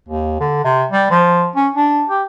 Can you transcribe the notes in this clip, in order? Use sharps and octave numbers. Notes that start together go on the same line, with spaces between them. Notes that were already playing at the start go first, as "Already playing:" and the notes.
D#2
D3
C3
G3
F3
C#4
D4
G4